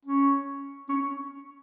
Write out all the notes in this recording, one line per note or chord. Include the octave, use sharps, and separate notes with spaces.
C#4
C#4